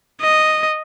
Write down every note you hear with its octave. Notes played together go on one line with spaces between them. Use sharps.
D#5